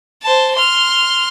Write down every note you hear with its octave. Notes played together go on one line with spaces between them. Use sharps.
C5 A5
C6 F6